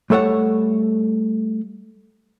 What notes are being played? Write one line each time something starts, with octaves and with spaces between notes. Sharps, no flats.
G3 A3 A4 C#5 F#5